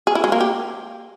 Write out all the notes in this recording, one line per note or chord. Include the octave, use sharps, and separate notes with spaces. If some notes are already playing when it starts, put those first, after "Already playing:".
G#4
E4
G#3
A#3
G4